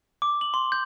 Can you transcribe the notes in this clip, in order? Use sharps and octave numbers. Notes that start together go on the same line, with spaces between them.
D6
F#7
C6
G6